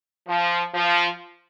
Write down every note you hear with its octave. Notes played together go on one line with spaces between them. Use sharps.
F3
F3